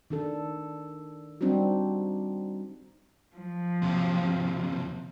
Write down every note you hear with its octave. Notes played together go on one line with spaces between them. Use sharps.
D#3 D4 A4
G3 C4 D4 D#4 F#4
F3
D#2 C3